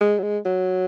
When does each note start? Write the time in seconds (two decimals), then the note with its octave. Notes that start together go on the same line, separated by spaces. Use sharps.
0.01 G#3
0.19 F#3
0.23 G#3
0.45 F#3